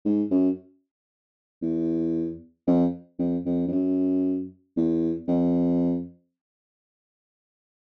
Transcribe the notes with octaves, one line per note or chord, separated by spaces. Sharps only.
G#2
F#2
E2
F2
F2
F2
F2
F#2
E2
F2